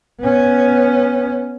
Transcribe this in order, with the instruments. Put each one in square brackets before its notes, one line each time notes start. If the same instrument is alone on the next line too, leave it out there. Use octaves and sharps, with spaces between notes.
[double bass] B3 C#4